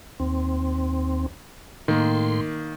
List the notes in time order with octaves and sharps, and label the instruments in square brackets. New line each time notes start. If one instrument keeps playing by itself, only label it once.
[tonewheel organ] D#2 C4
[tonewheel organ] A2 C6 [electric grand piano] D#3 A#3